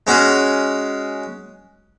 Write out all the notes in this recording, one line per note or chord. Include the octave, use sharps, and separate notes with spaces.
G#3 C#4 F#4